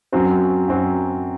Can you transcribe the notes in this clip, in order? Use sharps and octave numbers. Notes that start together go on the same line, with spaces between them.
F#2 F#3 C4 F#4
F#2 F#3 C4 F#4